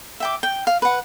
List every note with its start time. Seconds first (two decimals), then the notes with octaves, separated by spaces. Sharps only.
0.20 E5 G5 D6
0.43 G5
0.67 F5
0.82 B4 F#5